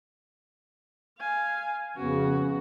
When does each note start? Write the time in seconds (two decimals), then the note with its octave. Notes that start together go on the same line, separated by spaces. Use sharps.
1.19 F5 G#5
1.97 F2 C#3 B3 C#4 F#4